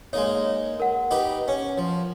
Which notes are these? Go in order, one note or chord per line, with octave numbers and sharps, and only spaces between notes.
G#3 A#3 D#4 C#5
A#4 F#5
D#4 G4 B4
C#4
F3